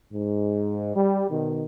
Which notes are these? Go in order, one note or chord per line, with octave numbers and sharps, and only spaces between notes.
G#2
G3
B2 D#3